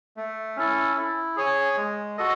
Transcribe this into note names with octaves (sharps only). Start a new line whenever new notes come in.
A3
C#4 E4 A4
E4
G#4 C#5 G#5
G#3
F#4 A4 D#5